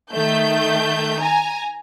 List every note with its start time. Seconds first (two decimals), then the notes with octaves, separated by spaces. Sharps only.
0.12 D#3 A3 G6
1.21 G#5 A#5